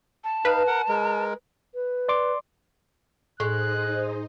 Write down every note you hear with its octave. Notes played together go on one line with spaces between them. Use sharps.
A5
D#4 B4 F5
A#4 F#5
G#3 A#4
B4
D5 C6 D6
A2 G#3 D#4 C5 D#5 F#6